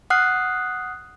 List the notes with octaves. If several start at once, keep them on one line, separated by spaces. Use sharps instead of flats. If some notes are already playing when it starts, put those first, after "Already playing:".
F#5 D#6 F6 F#6 C7